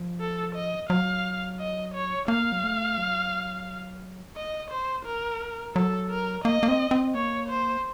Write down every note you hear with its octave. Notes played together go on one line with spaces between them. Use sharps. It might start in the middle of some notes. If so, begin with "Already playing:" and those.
Already playing: F3
A4
D#5
F#3 F5
D#5
C#5
A#3 F5
F#3
A3
F#3
D#5
C5
A#4
F#3 A4
A#4
A#3 D#5
A#3
C4
C4
A#3 C#5
C5